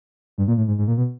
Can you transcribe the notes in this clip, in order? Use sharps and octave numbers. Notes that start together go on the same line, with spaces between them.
G2
A#2
A2
G#2
G#2
A#2
B2